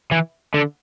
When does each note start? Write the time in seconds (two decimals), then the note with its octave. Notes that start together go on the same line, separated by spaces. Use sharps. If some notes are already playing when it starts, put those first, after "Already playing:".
0.11 E3
0.54 D3